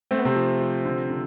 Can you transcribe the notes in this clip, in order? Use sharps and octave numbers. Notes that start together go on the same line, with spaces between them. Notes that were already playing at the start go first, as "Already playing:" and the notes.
A3 C4
B3
C3 C4
F3
F3
D3
D3